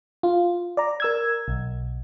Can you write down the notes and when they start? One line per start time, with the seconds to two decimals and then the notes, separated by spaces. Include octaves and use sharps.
0.23 F4
0.77 D5 A#5
1.00 A#4 E6 G#6
1.48 B1